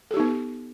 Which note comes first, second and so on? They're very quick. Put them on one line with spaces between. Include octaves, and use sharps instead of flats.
A4 G4 D#4 B3